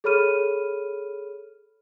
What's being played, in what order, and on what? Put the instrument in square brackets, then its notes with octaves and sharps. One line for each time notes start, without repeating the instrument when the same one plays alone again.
[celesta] G#4 A4 C#5 B5 F6 D#7